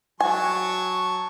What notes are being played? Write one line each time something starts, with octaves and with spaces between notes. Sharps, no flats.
F#3 G#5 A5 C#6